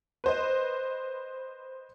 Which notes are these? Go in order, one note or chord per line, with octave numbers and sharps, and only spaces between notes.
B4 C5 D#5